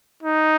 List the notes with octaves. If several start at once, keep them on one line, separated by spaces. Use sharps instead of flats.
D#4